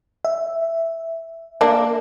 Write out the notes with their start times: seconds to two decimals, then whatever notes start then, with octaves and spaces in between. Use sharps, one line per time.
0.25 E5
1.61 A#3 D4